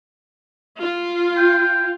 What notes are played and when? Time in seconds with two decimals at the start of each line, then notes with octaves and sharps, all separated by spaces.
0.80 F4
1.37 G5